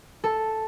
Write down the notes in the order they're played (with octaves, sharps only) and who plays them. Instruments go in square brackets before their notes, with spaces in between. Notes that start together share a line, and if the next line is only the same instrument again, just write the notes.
[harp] A4